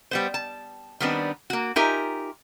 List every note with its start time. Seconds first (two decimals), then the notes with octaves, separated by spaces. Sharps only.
0.11 G3 B3 C5
0.34 A5
1.00 D#3 G3 B3 C4 D4 B4
1.50 A#3 F#4
1.76 D#4 F4 G4 A#4 E5 G#5